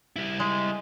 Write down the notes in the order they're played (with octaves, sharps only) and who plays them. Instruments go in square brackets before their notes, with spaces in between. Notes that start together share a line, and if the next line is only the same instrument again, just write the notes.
[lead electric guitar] G3 E4
[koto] G#3